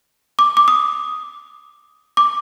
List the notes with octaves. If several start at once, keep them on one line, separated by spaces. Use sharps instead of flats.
D6
D6
D#6
D6